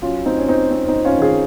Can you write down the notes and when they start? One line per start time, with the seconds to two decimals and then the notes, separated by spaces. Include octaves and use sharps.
0.02 F#3 C#4 F4
0.25 F2 C4 D#4
0.38 C#4
0.48 F2 C4 D#4
0.71 F2 C4
0.88 C4 D#4
0.94 F2
1.05 C#4 F4
1.16 D#3
1.22 F4 G#4